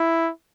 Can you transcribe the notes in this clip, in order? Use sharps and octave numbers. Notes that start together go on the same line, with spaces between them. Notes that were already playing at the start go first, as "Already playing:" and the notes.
Already playing: E4